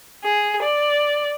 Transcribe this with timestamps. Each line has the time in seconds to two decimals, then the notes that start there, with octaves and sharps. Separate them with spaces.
0.24 G#4
0.63 D5